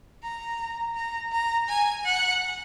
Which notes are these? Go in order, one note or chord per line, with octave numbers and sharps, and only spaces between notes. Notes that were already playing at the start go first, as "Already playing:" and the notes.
A#5
A#5
A#5
G#5
F#5